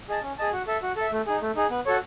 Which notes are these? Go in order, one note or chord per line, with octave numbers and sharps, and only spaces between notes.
G#4 D#5 A5
C#4
G#4 D#5 A5
F#4
A4 E5
F#4
A4 E5
A3
D#4 G#4
A3
D#4 G#4
B3
F#4 A4 C#5